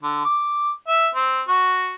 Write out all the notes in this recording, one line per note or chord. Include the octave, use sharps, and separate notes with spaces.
D3
D6
E5
C4
F#4